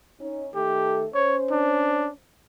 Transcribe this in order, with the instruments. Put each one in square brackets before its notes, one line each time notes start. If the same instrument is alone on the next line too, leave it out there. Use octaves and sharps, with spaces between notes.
[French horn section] C#4 D#4
[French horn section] D#3 A3 A4 [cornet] G4
[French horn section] C#4 C5 [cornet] C#5
[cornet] D4